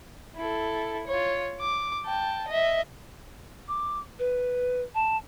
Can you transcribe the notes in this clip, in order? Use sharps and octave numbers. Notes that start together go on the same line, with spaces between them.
E4 A4
F4 C#5
D6
G5 A5
D#5 E5
D6
B4
A5